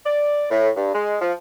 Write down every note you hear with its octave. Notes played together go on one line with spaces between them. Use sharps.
D5
A2
G2
G#3
F3